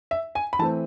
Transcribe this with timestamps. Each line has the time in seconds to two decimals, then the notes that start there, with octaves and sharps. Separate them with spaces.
0.11 E5
0.35 G#5
0.53 B5
0.59 E3 A3 C4 A5